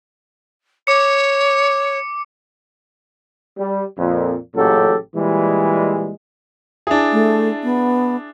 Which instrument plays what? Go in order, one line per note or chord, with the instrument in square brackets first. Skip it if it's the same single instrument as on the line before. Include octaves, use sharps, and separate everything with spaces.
[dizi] C#5 [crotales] D6 C#7
[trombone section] G3
F2 A#2
A1 A#2 C#3 F#3 G4 A4
A#2 E3 G3 G#3
[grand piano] D4 E4 G#4
[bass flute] A3
B3